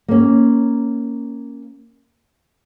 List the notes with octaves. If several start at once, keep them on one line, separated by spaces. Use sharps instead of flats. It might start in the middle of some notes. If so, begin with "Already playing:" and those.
A#3 C#4